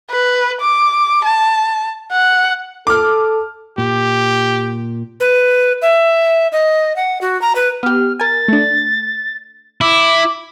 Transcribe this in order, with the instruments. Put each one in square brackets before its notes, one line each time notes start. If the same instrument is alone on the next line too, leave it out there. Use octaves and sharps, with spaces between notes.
[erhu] B4
D6
A5
F#5
[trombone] A4 [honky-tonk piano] D6 F6
[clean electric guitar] A#2 [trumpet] G4
[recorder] B4
E5
D#5
F#5
F#4
A#5
B4
[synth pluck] B3 G4 [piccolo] F6
[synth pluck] A#4 G#5 [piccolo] A6
[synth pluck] A3 D4
[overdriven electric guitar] E4 [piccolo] D6